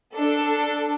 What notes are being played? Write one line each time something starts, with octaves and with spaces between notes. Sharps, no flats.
D4 A4